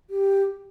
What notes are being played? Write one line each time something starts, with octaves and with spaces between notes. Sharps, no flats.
G4